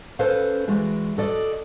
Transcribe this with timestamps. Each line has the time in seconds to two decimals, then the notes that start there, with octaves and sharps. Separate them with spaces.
0.19 C#4 A4 B4 C5 F5
0.67 E3 G#3 F#4 D5
1.17 F#4 A4 D5 D#5